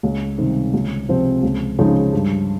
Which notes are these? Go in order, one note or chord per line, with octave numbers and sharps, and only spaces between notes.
C#2
C3 D#3 G3
C#2
C3 F3 C4
C#2
C#3 F3 G#3 D#4
G2